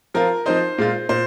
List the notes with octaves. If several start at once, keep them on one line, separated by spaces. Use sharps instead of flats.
F3 C4 F4 A#4
F3 C4 D#4 C5
A#2 G#3 F4
A#2 C5